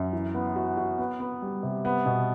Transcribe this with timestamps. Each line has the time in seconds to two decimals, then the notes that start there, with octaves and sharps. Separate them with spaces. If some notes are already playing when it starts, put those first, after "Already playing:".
Already playing: F#2
0.13 E3
0.34 B3
0.56 F#4
0.77 F#4
0.99 B3
1.20 B3
1.42 G3
1.63 C3
1.85 B3
2.06 B2